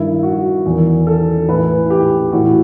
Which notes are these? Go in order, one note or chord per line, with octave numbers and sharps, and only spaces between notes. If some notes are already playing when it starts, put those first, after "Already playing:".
Already playing: G2 D#3 E4
F#4
E2 D#3
A4
A2 E3 B4
G4
A2 E3 F#4